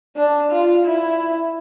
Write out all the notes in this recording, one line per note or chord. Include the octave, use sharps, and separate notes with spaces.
D4
F4
E4